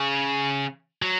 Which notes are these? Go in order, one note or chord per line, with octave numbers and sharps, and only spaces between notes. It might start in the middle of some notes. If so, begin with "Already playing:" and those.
Already playing: C#3
F#3